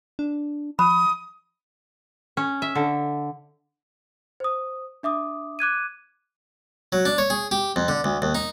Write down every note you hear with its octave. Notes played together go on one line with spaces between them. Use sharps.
D4
F3 B5 D#6
C#4
E5
D3
C5 D#6
D4 E5 D6 D#6
D6 F#6 G#6 D#7
F#3
D4
C#5
G#4
G4
F2
D3
D2
D#2
D#4